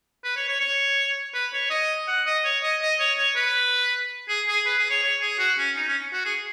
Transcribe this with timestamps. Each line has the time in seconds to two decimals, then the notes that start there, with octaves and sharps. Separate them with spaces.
0.24 B4
0.37 C#5
0.48 C#5
0.61 C#5
1.34 B4
1.53 C#5
1.71 D#5
2.08 F#5
2.26 D#5
2.45 C#5
2.63 D#5
2.82 D#5
3.00 C#5
3.18 C#5
3.36 B4
4.28 G#4
4.48 G#4
4.66 B4
4.78 G#4
4.91 C#5
5.03 C#5
5.21 G#4
5.39 F#4
5.58 C#4
5.76 D#4
5.88 C#4
6.13 F#4
6.25 G#4